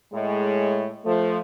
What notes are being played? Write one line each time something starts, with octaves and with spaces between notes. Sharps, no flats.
A2 G#3
F3 A3